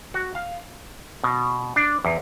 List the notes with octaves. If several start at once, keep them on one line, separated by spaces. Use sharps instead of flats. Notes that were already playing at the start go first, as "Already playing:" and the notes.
F#4
F5
B2
D4
E2